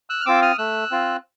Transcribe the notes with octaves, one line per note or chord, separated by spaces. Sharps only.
E6 F#6
F6
C4 F4 D6 E6
D#6 F6
A3 E6 F#6
C4 F4